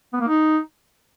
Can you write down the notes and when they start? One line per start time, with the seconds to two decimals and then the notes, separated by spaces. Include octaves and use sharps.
0.13 B3
0.20 A#3
0.28 D#4